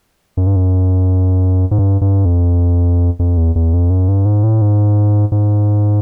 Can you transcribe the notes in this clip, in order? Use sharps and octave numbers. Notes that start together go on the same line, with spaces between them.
F#2
G2
F#2
G#2
G2
G2
F2
F2
E2
E2
F2
F#2
G2
G#2
A2
G#2
G#2